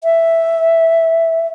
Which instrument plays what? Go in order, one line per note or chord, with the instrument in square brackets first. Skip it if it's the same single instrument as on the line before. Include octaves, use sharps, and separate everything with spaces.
[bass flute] E5